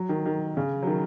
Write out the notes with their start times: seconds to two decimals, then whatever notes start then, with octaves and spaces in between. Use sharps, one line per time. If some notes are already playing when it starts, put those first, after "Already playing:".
Already playing: F#3
0.09 D#3
0.26 D#3
0.57 C#3
0.82 F#3
0.87 D#3